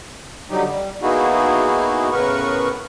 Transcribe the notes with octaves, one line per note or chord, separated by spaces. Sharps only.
D3 F#3 G3 D#4 G4
G3
A#3 B3 D#4 E4 F#4 G#4
A2 C#3 B3 A#4 B4 C#6